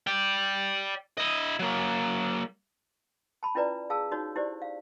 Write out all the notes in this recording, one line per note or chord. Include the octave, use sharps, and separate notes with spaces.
D5 G5
E4 D#5
F#3 A#3
A5 B5
C#4 E4 F4 B4 D5 A#5
G#4 F5 A5 E6
D#4 F#4 C#5
E4 G4 C5 D5
F5